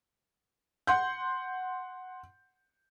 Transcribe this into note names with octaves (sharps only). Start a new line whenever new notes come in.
F#5 C6 G6